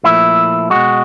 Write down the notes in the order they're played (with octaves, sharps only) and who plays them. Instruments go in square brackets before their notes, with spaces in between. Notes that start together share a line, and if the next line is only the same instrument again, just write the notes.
[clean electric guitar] A#2 F3 A3 E4
B2 G#3 F#4